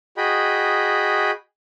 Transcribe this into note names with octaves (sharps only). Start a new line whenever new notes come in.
F#4 G#4 D#5 G5 B5